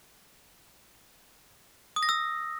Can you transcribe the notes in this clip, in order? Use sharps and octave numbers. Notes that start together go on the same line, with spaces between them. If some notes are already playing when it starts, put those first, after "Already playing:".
D#6
A#6
E6